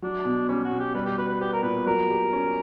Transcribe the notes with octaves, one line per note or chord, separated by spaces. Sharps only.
F#3 D4
B2
G3 C#4
F#4
B2
G4
G3 B4
G4
F#4 B4
B4
B3 G4
A#4
A#2 B4
F#3 A#4
G4
C#4